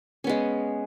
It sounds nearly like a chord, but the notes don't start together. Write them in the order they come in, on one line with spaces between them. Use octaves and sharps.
C#4 B3 G#3